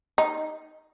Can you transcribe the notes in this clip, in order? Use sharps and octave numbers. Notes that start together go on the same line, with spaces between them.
D#4